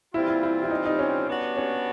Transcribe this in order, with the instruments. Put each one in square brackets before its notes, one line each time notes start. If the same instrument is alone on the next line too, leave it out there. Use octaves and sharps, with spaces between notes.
[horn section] E3 G3 C4 F4 [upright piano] E4
[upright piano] E4
E4
E4
D#4
D#4
C#4
[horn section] G3 B3 D4 F#4
[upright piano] C#4